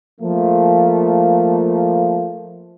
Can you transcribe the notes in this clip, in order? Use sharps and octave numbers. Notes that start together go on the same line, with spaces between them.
F3 A3 A#3